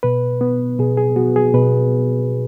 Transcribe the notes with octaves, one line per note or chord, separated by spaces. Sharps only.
B2 B4
B3
B2 G#4
G#4
B3 F#4
G#4
B2 B4